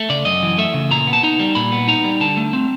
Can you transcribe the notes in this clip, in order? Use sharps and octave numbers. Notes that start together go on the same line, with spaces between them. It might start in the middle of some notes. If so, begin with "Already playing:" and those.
Already playing: A3
C#3 D5
F#2 D#5
E3
A3 E5
C#3
A#2 A#5
B3
A5
D#4 A#5
G3
A#2 B5
B3
D#4 A#5
G3
D3 A5
A3
C4